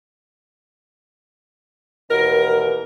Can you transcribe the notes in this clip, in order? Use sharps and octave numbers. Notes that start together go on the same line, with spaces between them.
D#2 B2 E3 A#4